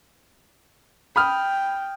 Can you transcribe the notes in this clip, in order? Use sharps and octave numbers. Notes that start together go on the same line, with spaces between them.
G5 B5 D#6 F6